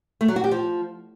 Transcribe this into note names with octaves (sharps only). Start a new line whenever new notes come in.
A3
F#3
F#4
G4
F3